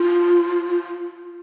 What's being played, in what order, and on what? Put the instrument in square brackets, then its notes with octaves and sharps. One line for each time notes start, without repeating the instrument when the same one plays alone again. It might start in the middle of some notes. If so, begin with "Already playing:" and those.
Already playing: [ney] F4